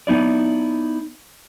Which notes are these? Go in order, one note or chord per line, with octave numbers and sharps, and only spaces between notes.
B3 D#4 E4 D5